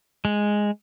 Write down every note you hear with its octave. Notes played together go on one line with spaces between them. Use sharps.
G#3